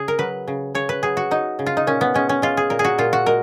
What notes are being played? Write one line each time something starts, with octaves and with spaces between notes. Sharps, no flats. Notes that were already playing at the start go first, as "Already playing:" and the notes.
Already playing: C#3 G#4
A#4
F#3 B4
C#3
C#3 C#5
B4
F#3 G#4
F#4
F#3 D#4
C#3
F4
D#4
A#2 C#4
B3
G#3 C#4
C#4
G#3 F4
G#4
A#2 A#4
G#4
F#4
A#2 F4
F#4
G#3 A#4